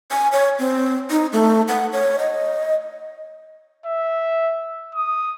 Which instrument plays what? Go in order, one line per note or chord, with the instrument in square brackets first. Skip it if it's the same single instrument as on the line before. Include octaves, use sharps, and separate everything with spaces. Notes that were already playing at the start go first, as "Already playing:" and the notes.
[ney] G#5
C#5
C4
D#4
A3
F#5
C#5
D#5
[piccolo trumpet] E5
D#6